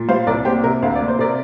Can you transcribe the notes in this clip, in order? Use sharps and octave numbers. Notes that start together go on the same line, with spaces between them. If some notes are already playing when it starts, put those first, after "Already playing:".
Already playing: A#2
G3 C5 F5
C2 A#4 D5
A#3 G4 C5
C3 A#4
D2 F5
D5
A#3
C5
C3 A#4 D5